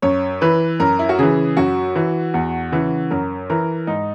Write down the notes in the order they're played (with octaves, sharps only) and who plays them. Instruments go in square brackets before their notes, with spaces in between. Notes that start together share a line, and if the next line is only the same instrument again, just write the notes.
[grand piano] F#2 C#5
E3 B4
F#2 A#4
E4
F#4
C#3 E3 G#4
F#2 F#4
E3
E2
C#3 E3
F#2 A#4
E3 A#4
G#2 D#4